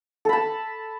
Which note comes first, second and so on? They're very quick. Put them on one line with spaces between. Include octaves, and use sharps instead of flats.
A4 B5 A5